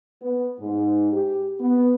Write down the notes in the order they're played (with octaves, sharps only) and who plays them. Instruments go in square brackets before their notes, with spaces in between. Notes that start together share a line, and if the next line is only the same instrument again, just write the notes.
[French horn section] B3
G#2
G4
B3